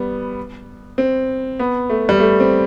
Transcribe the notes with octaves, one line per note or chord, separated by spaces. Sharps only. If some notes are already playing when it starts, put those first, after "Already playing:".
Already playing: G3 B3
C4
B3
A3
G3
A3
C4